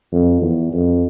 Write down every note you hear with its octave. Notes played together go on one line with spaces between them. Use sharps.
F2
E2
F2